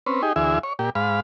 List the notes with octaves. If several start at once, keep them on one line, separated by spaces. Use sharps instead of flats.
C4 C#4 B4
D#4 G4 G#4
D2 E3 G#4 E5
C#5
A#2 G4
G#2 F5 B5